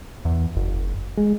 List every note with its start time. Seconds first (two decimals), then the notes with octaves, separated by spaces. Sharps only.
0.25 E2
0.56 F#1
1.17 G#3